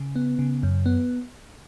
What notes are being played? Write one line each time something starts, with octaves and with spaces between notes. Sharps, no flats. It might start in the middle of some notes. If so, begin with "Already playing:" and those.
Already playing: C#3
B3
C#3
F#2
B3